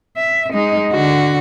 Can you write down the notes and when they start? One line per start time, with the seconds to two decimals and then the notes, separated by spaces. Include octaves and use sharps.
0.17 E5
0.53 G#3 D#4
0.91 D3 F#4